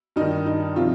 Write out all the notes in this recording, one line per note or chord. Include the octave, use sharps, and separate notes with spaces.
G2 D#3 D#4
D#4
C3 F3 F4